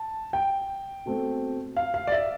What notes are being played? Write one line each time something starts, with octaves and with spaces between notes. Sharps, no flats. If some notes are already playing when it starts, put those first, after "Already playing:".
Already playing: A5
G5
B2 A3 C4
F5
F5
D5
E5